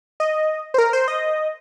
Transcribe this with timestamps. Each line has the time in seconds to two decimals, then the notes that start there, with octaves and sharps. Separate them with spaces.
0.20 D#5
0.74 C5
0.78 A#4
0.93 C5
1.08 D#5